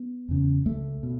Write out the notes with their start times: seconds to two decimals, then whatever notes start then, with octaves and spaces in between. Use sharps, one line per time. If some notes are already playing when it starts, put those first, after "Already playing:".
Already playing: B3
0.28 E2 C#3
0.65 C#2 A3
1.03 B2